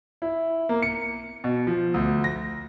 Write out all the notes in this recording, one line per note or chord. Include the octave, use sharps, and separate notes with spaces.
E4
A#3
C#7
B2
F3
D2
A#6